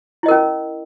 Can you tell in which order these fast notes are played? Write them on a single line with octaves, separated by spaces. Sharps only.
E4 D#5 A#4 C#4